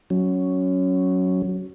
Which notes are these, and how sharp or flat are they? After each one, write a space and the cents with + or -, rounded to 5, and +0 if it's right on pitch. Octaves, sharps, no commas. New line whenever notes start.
F#3 +0 C#4 +0